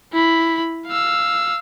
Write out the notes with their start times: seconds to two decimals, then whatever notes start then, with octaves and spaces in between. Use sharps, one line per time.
0.12 E4 B5
0.87 F5 E6